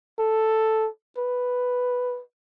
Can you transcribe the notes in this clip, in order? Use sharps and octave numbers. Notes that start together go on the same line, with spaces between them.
A4
B4